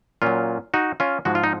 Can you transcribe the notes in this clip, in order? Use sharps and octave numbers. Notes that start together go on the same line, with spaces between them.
A#2 F#3 C#4 F4
D#4 F#4
C#4 F4
G#2 F3 G#3 F#4
F4
D#4